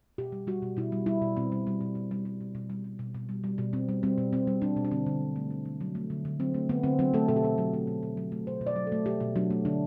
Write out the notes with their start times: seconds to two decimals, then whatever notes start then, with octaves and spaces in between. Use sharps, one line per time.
0.18 B2 G4
0.32 G3
0.47 G3 F#4
0.62 B2
0.77 B2 E4
0.92 G3
1.06 G3 E4
1.22 B2
1.36 B2 C4
1.52 G3
1.67 G3
1.81 B2
1.95 B2
2.11 G3
2.25 G3
2.41 B2
2.55 B2
2.70 G3
2.84 G3
2.99 B2
3.14 B2
3.29 G3
3.44 G3
3.58 B2
3.73 B2 C4
3.89 G3
4.03 G3 C4
4.18 B2
4.33 B2 C4
4.47 G3
4.62 G3 D4
4.77 B2
4.85 D4
4.91 D3 C4
5.07 D3
5.21 F#3
5.36 A3
5.51 D3
5.65 D3
5.81 F#3
5.95 A3
6.10 D3
6.25 D3
6.40 F#3 C4
6.54 A3
6.69 D3 B3
6.83 D3 C4
6.99 F#3 C4
7.14 A3 A4
7.28 B2 A4
7.36 G4
7.43 B2 A4
7.58 F#3
7.73 A3
7.87 B2
8.03 B2
8.17 F#3
8.32 A3
8.47 B2 C5
8.61 B2
8.67 D5
8.76 F#3
8.87 A4
8.92 A3
9.06 B2 G4
9.21 B2
9.36 F#3 D4
9.51 A3
9.65 D3 D4